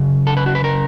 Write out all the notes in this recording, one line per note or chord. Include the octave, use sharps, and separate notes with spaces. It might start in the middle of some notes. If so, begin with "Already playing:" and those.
Already playing: F#2 C#3
A4
B4
F#4
B4
A#4